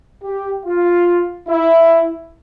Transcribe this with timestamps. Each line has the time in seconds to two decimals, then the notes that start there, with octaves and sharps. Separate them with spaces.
0.23 G4
0.65 F4
1.48 E4